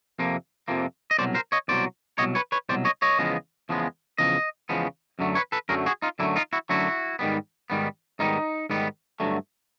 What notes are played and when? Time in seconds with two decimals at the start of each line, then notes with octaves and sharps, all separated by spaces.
0.19 F2 C3 F3 A#3
0.68 F2 C3 F3 A#3
1.11 D#5
1.18 C2 B2 F#3 C5 D5
1.34 A#4 C5
1.52 C#5 D#5
1.68 C2 B2 F#3 C5 D5
2.18 C2 B2 F#3 C#5 D#5
2.35 B4 C#5
2.52 B4 C#5
2.69 C2 B2 F#3 C5 D5
2.85 C#5 D#5
3.02 C#5 D#5
3.19 E2 C#3 F3 G#3 B3
3.69 E2 C#3 F3 G#3 B3
4.18 E2 C#3 F3 D#5
4.69 E2 C#3 F3 G#3 B3
5.19 F#2 D3 F#3 A3
5.35 B4 C#5
5.52 A4 B4
5.69 F#2 D3 F#3 A3 G#4 A#4
5.86 F#4 G#4
6.02 D#4 F4
6.19 F#2 D3 F#3 A3 D4 E4
6.36 D#4 F4
6.53 E4 F#4
6.69 F#2 D3 F#3 A3 E4 F#4
7.19 G#2 D#3 G3 B3
7.70 G#2 D#3 G3 B3
8.19 G#2 D#3 G3 B3 D#4 F4
8.70 G#2 D#3 G3 B3
9.20 G2 D3 F#3 A3